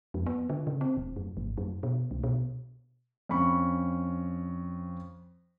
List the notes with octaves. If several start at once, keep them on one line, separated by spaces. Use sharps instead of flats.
F2
B3
D3
C#3
C4
D#1
F#2
G#1
F#2
B2
C2
B2
F2 C#4 B5 C#6